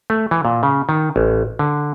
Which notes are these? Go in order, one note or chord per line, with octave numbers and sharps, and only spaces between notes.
A3
E3
A#2
C#3
D#3
A1
D3